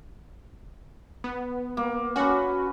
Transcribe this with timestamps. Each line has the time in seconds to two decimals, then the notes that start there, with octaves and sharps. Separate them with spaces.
1.24 B3
1.77 A#3
2.16 C#4 F#4 B4